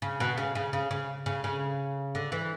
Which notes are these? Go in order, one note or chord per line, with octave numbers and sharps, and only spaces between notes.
C#3
B2
C#3
C#3
C#3
C#3
C#3
C#3
D3
E3